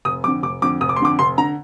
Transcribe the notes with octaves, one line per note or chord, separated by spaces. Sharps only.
F1 D#6
F2 D3 D6
F1 D6
F2 D3 D6
F1 D#6
D6
C6
F2 D3 D6
F1 C6
D3 A#5